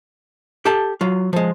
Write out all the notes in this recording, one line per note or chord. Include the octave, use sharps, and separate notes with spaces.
G4 A4 A5
F#3 F4
F3 G#3